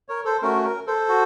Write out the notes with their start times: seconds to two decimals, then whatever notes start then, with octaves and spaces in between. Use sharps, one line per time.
0.09 A#4 C#5
0.25 A4 C5
0.42 A3 C#4 F#4 A#4
0.64 A#4
0.87 A4 C5
1.09 F#4